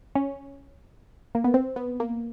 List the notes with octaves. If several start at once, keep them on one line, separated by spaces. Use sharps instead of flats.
C#4
A#3
B3
C4
B3
A#3